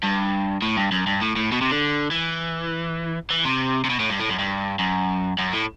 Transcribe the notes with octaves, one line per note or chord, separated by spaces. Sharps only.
G2
A2
G2
F#2
G2
A2
A2
B2
C3
D3
E3
E3
C3
C3
B2
A2
G2
A2
F#2
G2
F#2
F#2
A2